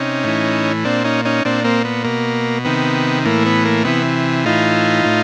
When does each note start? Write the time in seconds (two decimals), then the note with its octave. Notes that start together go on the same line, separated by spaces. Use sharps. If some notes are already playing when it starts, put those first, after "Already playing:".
Already playing: C3 C#4 D#4
0.24 A2 E3
0.85 A#2 C4 D4
1.04 C#4 D#4
1.25 C#4 D#4
1.45 A#2 C4 D4
1.64 A#3 C4
1.85 B3
2.04 B2 A#3
2.65 C3 D#3 B3
3.25 A2 E3 A#3
3.46 B3
3.65 A#3
3.85 C3 E3 B3
4.45 A2 E3 D#4 F4
5.05 A2